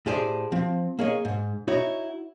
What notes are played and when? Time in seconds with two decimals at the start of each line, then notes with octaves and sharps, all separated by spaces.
0.06 A2 G4 G#4 C5 D5
0.52 F3 C4
0.99 A#3 G#4 C#5 D#5
1.25 G#2
1.68 D#4 E4 F#4 C#5